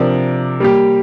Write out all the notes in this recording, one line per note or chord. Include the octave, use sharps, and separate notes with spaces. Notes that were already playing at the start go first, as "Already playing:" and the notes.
Already playing: C3 F3 D4 A#4 D5
G3 A#3 G4